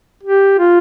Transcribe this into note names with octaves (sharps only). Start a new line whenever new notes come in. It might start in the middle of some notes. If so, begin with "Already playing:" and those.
G4
F4